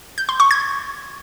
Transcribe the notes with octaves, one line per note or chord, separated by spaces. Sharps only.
G6
C6
C#6
G#6